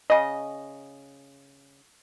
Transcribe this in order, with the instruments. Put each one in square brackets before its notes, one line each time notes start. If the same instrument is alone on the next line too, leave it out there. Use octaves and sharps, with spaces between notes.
[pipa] C#3 D#5